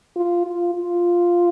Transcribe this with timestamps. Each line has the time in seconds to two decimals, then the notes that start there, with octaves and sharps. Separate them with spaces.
0.16 F4
0.46 F4
0.75 F4